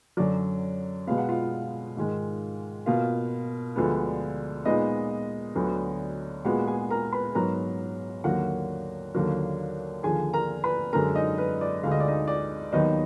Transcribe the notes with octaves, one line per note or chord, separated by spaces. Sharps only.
F#2 D3 F#3 D5
B2 G#3 B3 F5
F#5
F4 F5
G#2 D#3 G#3
B2 A#3 F4 F5
D2 D3 F3 G#3 B3
A#2 G#3 B3 D#4 D#5
D2 D3 F#3 B3
A#2 G#3 B3 F#4 F#5
G#4 G#5
A#4 A#5
B4 B5
G#2 F#3 B3 A#4 A#5
D#2 D3 F#3 A#3 F#4 F#5
D#2 D3 F#3 A#3
D#2 D3 F3 G#4 G#5
A#4 A#5
B4 B5
F#2 D3 G#3 A#4 A#5
D#4 D#5
B4
D5
D2 D3 G#3 F5
D#5
D5
D#4 D#5
D5
D#2 D#3 F#3 B3 D#4 D#5